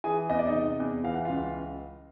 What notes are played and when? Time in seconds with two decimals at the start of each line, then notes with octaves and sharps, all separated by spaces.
0.04 E3 G#4 G#5
0.30 E2 D#5
0.39 D5
0.47 D#4 D#5
0.54 C3
0.80 E2
1.04 E3 F5
1.14 F#5
1.25 C#2 F4 F5